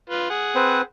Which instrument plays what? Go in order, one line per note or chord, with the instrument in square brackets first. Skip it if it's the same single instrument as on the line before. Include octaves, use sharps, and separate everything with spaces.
[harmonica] F4 B4
G#4 F#5
[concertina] C4 B4 C5